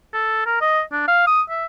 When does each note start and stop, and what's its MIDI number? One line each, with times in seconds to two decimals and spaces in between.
0.13 0.44 69
0.46 0.59 70
0.61 0.82 75
0.92 1.04 62
1.08 1.25 77
1.27 1.42 87
1.50 1.65 76